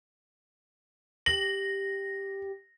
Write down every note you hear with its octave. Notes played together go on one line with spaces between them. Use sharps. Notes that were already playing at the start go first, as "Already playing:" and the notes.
G4 A#6 F#7